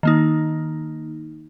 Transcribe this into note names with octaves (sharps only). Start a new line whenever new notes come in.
D#3 A#3 D#4